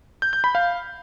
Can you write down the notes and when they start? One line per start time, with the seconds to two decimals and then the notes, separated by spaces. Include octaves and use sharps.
0.22 G6
0.33 G6
0.44 B5
0.55 F5